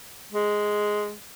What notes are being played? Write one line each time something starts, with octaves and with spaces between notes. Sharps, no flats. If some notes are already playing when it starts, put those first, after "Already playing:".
G#3